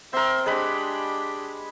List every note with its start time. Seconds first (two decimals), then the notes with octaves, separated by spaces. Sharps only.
0.13 C4 A#4 E5 C6
0.46 G#3 D4 G4 B4 B5